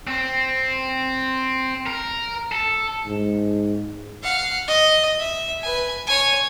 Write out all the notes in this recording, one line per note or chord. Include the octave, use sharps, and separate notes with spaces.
C4
A#4
A4
G#2
F5 F#5
D#5
E5
B4 G#5
C#5 G#5